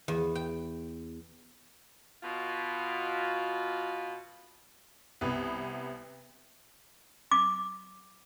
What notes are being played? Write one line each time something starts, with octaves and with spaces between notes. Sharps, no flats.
E2
G5
B2 F4
C2 B3
D6